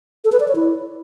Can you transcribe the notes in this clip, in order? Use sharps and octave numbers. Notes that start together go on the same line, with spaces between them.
A4
B4
D5
C#5
E4